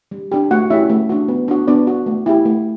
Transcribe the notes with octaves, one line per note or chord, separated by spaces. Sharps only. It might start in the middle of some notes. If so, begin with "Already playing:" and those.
G3
D4 G4
A3 F#4 F#5
C#4 E4 G4 E5
A3
D4 F#4
B3
D4 F#4
B3 D4 D5
F#4
A3
E4 G4
A3